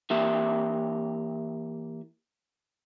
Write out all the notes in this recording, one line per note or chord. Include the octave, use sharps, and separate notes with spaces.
E3 A#3 G4 E5